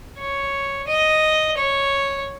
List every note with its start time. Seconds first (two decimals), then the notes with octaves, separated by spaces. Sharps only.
0.19 C#5
0.88 D#5
1.58 C#5